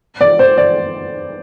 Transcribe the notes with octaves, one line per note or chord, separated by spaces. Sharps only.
D5
C5
D5